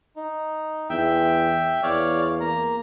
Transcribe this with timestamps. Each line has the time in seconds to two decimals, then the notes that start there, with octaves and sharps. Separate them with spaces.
0.16 D#4
0.90 E2 E5 G5
1.83 E2 C#5 D5 F5
2.41 A#3 A#5